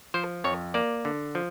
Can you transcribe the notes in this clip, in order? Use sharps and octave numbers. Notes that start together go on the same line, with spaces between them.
F3 C5
F2 C#5
A#3 D5
D3
F3